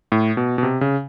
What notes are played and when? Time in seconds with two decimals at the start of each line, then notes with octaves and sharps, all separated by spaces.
0.12 A2
0.37 B2
0.58 B2
0.63 C3
0.81 C#3